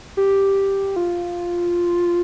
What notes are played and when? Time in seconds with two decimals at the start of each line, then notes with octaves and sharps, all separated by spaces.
0.17 G4
0.96 F4